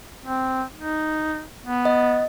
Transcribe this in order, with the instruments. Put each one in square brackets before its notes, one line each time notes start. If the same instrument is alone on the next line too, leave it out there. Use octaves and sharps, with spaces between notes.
[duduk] C4
D#4
B3
[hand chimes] D#5